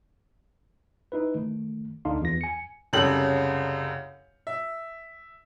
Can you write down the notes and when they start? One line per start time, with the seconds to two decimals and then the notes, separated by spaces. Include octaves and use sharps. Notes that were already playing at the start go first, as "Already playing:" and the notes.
1.12 D#4 E4 B4
1.35 D#3 A3
2.05 D2 D3 D4 D#4 F5 C6
2.21 E2 F4 A#6
2.41 G#5 C#7
2.93 C2 F#2 C#3 G4 A4 F#7
4.47 E5